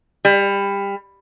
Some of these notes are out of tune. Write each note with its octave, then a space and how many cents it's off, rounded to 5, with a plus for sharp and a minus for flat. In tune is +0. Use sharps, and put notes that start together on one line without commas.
G3 +25